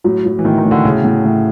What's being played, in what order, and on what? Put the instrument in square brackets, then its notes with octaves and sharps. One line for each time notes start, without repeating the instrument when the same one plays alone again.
[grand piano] A2 [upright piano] F#3
[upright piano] F#3
[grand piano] E3
[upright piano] A2 [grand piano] D#3
[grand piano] D#3
[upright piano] A2
[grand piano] D3
[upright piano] A2 [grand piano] C#3
[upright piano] A2
A2